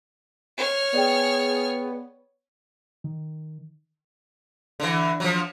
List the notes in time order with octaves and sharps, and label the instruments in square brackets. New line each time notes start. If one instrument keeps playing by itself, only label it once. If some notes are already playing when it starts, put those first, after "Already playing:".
[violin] C#5 F6
[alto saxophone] B3 [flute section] G#4 [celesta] D5 G5
[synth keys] D#3
[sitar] D3 E3
F3 F#3